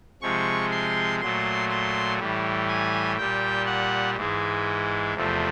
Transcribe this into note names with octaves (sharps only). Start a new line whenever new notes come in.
C3 F3 G#3 C#6
C6
A#2 F#3 A3 C6
C6
A2 E3 G3
G#5
A#2 G3 G5
F#5
G#2 E3 G#3
E2 C3 F3 A3